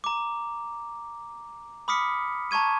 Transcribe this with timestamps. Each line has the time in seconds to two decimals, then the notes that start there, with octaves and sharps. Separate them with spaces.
0.04 A#5 D6
1.88 B5 D6 D#6 F6 B6 C#7
2.51 A5 A#5 C#6 G#6 D#7